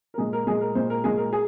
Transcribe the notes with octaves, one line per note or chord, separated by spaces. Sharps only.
A#4
A#2 G#3 G#4
A#4
A#2 G#3 G#4
A#4
A#2 G#3 C5
A#4
A#2 G#3 G#4
A#4
G#4